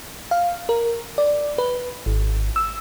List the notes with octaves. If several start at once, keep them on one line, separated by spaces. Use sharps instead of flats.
F5
A#4
D5
B4
G#1
E6